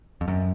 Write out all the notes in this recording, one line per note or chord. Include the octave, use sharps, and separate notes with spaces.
F2
F#2